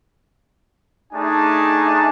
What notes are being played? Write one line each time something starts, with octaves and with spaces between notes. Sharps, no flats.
A3 D4 D#4 G#4 G#5 A5